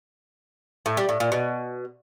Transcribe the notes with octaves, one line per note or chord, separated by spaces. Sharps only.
A2
G3
A2
A#2
B2